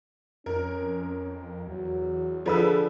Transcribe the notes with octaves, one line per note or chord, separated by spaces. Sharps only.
F2 C#4 A#4
E2 F#3
D3 F3 G#4 B4 E6